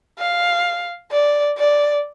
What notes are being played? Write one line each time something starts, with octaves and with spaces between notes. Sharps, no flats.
F5
D5
D5